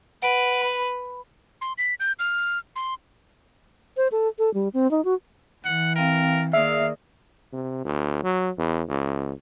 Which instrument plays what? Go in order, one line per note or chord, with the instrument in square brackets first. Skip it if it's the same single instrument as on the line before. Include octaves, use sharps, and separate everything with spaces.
[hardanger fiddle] B4 [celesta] F#5 D7
[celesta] B5
[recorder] C6
B6
G6
F6
C6
[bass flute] C5
A4
A4
G3
C4
D#4
F#4
[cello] E3 [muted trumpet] F#5
[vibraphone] C4 F5 G5 [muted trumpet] A#4
[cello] D#3 A#3 [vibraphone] G#4 D5 D#6 [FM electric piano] E5 [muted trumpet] F5
[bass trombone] C3
D2
F#3
E2
C#2